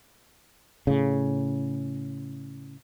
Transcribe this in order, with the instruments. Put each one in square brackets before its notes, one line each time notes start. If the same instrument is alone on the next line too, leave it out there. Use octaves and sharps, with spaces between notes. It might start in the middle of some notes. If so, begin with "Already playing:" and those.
[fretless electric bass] A2 C#3